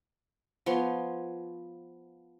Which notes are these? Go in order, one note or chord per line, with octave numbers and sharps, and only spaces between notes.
F3 B3 C#5 C6